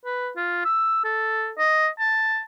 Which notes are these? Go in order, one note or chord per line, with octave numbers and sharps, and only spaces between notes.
B4
F4
E6
A4
D#5
A5